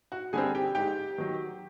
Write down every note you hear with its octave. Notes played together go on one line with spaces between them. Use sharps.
F#4 F#5
D3 G3 C4 G#4 G#5
G4 G5
G#2 G4 G5
D#3 F#3